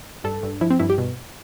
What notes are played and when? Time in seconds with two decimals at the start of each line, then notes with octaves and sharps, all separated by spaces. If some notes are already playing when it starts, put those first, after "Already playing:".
0.24 G2 A4
0.43 G2
0.61 F3 E4
0.70 C4
0.79 G2 E4
0.90 G4
0.98 B2